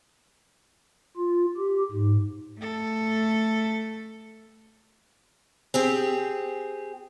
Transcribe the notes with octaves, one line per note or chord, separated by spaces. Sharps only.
F4
G4
G#2
A3 A4
C4 G4 G#4